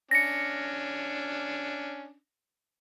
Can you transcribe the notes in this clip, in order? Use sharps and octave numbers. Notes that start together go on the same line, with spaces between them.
C#4 D4 A#6 C#7